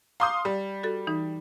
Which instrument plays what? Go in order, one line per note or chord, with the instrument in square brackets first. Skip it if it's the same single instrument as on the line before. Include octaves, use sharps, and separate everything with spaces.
[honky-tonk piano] F5 C6 D#6 [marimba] A#5 D6 G6
[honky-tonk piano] G3
[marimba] F#4 A4
E3 D#4